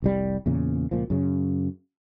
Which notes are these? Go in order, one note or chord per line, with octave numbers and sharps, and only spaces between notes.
F1 C2 G3
E2 A#2 C#3
C#2 A#2 F3
F#2 C#3